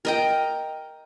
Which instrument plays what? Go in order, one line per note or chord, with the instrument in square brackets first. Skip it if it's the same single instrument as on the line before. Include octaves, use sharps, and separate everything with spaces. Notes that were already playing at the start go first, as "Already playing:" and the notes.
[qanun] A#4 D#5 G5